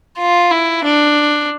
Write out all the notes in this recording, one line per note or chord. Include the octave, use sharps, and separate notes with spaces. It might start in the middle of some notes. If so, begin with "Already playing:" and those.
F4
E4
D4